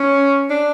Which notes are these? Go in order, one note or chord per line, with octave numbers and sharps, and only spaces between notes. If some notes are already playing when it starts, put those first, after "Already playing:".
Already playing: C#4
D4